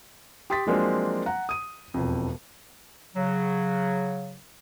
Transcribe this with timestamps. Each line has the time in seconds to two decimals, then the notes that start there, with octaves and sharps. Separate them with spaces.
0.50 G4 C6 D#6 A6 B6
0.67 F3 F#3 G#3 A#3 C4 D4
1.26 F#5 A#5
1.49 D#6 D#7
1.94 E1 F2
3.15 C#3 F#3